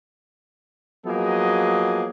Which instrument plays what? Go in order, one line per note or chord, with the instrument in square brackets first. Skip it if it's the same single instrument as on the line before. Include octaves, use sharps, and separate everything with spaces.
[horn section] F3 F#3 A#3 B3 G#4 D#5